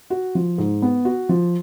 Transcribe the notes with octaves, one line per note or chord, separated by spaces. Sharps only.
F#4
F3
G#2
B3
F#4
F3